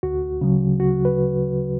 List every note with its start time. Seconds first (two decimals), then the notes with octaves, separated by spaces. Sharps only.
0.03 D2 F#4
0.41 C#3 F#3
0.79 D2 F#4
1.05 B4